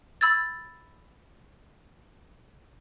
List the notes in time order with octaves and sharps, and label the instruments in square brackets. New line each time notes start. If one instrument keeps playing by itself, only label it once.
[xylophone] B5 E6 G#6 A6